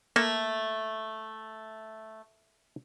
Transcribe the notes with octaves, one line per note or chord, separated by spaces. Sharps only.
A3 A#3 A4